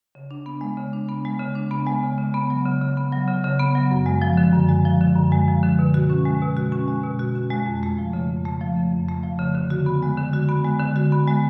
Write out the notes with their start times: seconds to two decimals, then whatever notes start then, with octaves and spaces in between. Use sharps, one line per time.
0.15 C#3
0.31 D4
0.46 B3
0.61 G#3
0.77 C#3
0.93 D4
1.09 B3
1.25 G#3
1.40 C#3
1.55 D4
1.71 B3
1.86 G#3
2.03 C#3
2.18 C#3
2.34 B3
2.50 F#3
2.65 C#3
2.81 C#3
2.97 B3
3.12 F#3
3.28 C#3
3.44 C#3
3.59 B3
3.75 F#3
3.91 F#2
4.06 G#3
4.22 F3
4.37 D3
4.53 F#2
4.69 G#3
4.85 F3
5.01 D3
5.16 F#2
5.32 G#3
5.48 F3
5.63 D3
5.79 B2
5.94 F#4
6.10 C#4
6.25 G#3
6.42 B2
6.57 F#4
6.72 C#4
6.88 G#3
7.04 B2
7.19 F#4
7.35 C#4
7.51 G#3
7.66 F2
7.83 A3
7.98 F3
8.13 C#3
8.29 F2
8.45 A3
8.61 F3
8.76 C#3
8.93 F2
9.08 A3
9.24 F3
9.39 C#3
9.55 D3
9.70 F#4
9.86 B3
10.03 G#3
10.18 D3
10.33 F#4
10.49 B3
10.65 G#3
10.80 D3
10.96 F#4
11.12 B3
11.27 G#3